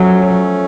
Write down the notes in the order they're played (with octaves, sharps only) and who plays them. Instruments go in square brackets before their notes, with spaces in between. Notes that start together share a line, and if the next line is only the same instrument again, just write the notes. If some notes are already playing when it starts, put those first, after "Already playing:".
Already playing: [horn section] F3 A3 C#4 [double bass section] F#3